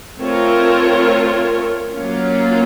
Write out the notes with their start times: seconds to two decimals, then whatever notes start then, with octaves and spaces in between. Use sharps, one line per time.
0.19 A3 C4 F4 A#4 C#5
1.93 F#3 A#3 C#4 F4